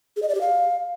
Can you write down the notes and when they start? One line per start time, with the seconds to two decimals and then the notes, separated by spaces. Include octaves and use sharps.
0.16 G#4
0.23 D#5
0.29 D5
0.35 G4
0.41 F5